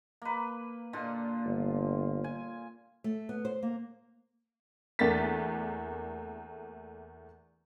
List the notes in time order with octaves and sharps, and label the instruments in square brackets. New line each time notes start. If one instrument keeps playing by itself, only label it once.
[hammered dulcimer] A#3 B4
A#2 D3 F4
[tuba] G1
[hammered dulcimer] G#5
[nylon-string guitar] A3
B3
C5
A#3
[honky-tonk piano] E2 A3 A#3 D4 A6 B6